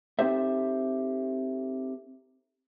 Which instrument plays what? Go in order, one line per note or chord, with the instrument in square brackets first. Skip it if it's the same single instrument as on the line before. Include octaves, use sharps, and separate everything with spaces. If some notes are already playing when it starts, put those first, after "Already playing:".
[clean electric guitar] C4 D#4 G4 A4 C5 E5